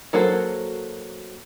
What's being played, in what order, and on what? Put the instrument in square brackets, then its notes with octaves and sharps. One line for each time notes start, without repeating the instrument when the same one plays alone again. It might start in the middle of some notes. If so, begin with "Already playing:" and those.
[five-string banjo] F#3 A#3 F#4 A4 C5